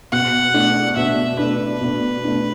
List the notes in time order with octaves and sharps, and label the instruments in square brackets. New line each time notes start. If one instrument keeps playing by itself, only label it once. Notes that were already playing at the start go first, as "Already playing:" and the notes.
[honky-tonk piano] B2 [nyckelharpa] F#5
[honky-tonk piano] A3 D4
[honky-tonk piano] B2 [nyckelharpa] E5
[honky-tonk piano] A3 D4 [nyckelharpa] B4
[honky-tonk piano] B2
A3 D4